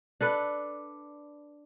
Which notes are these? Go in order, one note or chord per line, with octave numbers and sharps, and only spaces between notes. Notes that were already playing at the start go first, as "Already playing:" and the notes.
D4 A4 B4